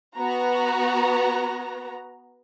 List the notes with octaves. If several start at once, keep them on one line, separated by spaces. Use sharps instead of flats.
B3 F#4 A#5